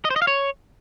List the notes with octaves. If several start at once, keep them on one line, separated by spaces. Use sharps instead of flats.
D#5
C5
D#5
F5
C#5